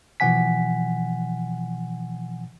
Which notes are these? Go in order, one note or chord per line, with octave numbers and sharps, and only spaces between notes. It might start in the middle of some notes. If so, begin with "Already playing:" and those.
B2 E3 F3 F#5 G#5 B6